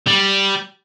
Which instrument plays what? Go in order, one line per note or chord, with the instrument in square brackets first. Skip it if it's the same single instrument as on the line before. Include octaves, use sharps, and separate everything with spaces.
[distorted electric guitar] G3